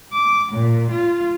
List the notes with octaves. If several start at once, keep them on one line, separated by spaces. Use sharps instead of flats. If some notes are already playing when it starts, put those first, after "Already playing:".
D6
A#2
F4